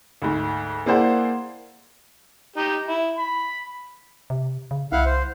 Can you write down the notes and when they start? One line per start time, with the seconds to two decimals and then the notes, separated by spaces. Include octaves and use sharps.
0.22 D2 G#2
0.86 A#3 E4 G#4 C5 D5 F#5
2.56 D#4 G4
2.87 E4
3.18 B5
4.30 C3
4.71 C#3
4.92 C2 E4 F5 F#5
5.05 C5